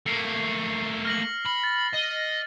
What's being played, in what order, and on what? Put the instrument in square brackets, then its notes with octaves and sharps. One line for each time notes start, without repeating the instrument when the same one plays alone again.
[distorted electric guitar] A3 A#3 [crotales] C7 C#7
[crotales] F6 A#6 F#7
[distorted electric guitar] B5
[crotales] A6
[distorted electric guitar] D#5